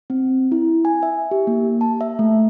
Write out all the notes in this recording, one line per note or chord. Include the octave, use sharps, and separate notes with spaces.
C4
E4
G#5
E5
G4
A#3
A5
E5
A3